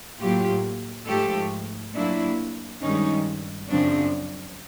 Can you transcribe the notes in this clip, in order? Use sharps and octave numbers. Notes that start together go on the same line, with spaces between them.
A2 F#3 A#3 F4 G4
G#2 F3 A3 G4 A4
A#2 F#3 A#3 D4 E4
G2 D#3 G#3 C#4 D#4
F#2 C#3 F3 C4 D4